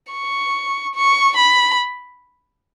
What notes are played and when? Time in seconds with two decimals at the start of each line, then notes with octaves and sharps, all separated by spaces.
0.12 C#6
0.95 C#6
1.37 B5